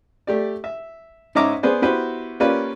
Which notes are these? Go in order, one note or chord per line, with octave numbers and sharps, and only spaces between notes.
A3 G4 D5
E5
G#2 C#4 D#5 E5 A#5 D6
B3 G#4 B4 C5 D5
B3 E4 F#4 G4 B4 C5
A#3 C#4 F4 G4 B4 D5